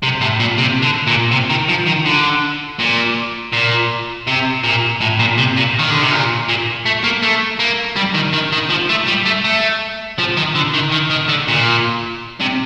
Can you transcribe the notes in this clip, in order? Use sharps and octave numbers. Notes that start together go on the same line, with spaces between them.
C3
A2
A#2
C3
D3
A#2
C3
D#3
F3
D#3
D3
A#2
A#2
C3
A#2
A2
A#2
C3
A#2
D#3
D3
C3
A#2
A#2
A3
A#3
A3
A#3
G3
D#3
D#3
D#3
F3
A3
G3
A3
A3
F3
D#3
D3
D#3
D#3
D#3
D3
A#2
C3